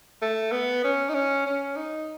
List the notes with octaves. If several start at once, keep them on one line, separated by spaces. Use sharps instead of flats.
A3
B3
C#4
D#4
C#4
C#4
D#4